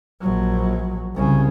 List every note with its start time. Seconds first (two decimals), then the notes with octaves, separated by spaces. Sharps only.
0.21 A#1 F#3
1.15 C2 C#3